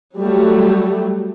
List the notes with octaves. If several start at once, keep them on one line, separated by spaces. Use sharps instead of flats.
F#3 G3 A3